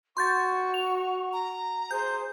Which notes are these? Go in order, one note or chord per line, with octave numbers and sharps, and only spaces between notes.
F#4 C6 C#6 G6 A6
F7
A#5
G#4 C5 G6